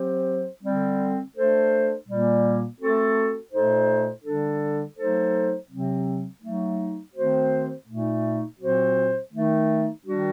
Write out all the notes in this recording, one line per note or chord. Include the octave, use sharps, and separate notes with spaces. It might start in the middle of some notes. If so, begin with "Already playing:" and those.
Already playing: F#3 C4 G4 C5
D3 G3 C4
A3 D4 A4 C5
A#2 G3 A#3
A3 C4 F#4 A4
A#2 A3 D#4 A4 C5
D3 G3 D4 A4
F#3 A3 D#4 A4 C5
C3 F#3 C4
F#3 A3 D#4
D#3 A3 C4 F#4 C5
A#2 A3 D#4
A#2 F#3 C4 F#4 C5
D#3 A3 D#4
D#3 G3 D4 F#4